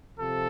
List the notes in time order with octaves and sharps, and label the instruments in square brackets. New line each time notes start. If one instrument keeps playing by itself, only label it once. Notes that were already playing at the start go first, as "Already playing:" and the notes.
[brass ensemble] C3 F3 A4